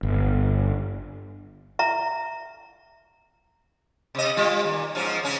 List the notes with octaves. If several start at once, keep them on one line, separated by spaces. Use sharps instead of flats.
G1
E5 A#5
C3 D#5
G3 F4
D#2 A#2
G#2 F3 C#4
C#3 C#4